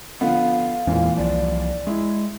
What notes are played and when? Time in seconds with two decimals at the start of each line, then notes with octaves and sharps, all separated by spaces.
0.21 D3 F3 B3 F5
0.87 E2 A#2 E3 G#3 C4
1.17 C2 F3 D5
1.87 G#3 E4